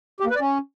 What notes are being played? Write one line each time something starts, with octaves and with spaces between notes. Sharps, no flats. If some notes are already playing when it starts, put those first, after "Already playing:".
G4
A#3
B4
D5
C#4